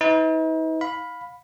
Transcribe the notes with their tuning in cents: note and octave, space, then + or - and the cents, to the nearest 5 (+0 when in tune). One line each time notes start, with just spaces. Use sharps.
D#4 +45 B4 +30
F5 +25 B5 +0